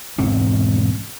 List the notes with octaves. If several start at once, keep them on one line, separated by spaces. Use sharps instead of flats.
E1 G#2 C4 C#4